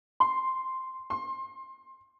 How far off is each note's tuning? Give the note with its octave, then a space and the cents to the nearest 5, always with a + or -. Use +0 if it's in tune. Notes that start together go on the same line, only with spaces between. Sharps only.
C6 +0
C6 +20